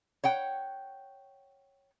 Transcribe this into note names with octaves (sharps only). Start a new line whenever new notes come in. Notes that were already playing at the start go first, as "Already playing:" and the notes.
C#5 F#5 G5